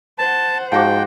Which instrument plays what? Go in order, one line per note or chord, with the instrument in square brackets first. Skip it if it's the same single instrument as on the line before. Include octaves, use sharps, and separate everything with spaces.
[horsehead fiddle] C5 F#5 [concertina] A5
[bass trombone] G#2 [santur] F3 F#4 D6 [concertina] G5